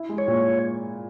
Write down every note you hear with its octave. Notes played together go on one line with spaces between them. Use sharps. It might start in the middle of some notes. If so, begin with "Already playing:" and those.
Already playing: E4
G#3
C#5
A#2